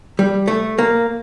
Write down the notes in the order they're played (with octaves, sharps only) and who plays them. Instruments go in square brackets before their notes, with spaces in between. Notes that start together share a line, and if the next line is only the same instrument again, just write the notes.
[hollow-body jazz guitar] G3
A3
A#3